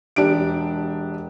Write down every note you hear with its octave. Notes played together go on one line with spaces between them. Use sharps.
E1 D4 G4 D7